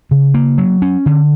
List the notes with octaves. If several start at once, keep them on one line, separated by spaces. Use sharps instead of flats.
C#3
A#3
F#3
C#4
D3